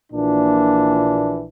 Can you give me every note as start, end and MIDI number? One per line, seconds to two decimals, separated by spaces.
0.13 1.45 34
0.13 1.45 46
0.13 1.45 52
0.13 1.45 62